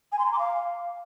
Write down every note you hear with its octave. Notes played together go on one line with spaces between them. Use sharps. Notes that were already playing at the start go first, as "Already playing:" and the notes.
G#5
C6
A#5
D6
F5